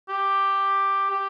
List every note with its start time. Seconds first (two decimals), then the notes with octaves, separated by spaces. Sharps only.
0.09 G4
1.10 G4